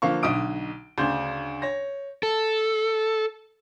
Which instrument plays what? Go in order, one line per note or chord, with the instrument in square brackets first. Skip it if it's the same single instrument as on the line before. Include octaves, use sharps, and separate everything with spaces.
[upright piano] D3 F3 A#3 F5 C#6
B1 D3 D#5 D#6 D7
D2 C#3 D4 C6 G6
C#5 A#6
[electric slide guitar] A4